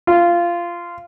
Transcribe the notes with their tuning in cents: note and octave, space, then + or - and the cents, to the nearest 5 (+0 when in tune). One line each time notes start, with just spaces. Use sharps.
F4 -15